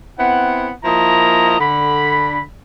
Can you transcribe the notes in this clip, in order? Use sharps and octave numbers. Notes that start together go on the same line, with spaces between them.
B3 C4 E4 F#5
F3 A#3 E4 D#5 A#5
D3 B5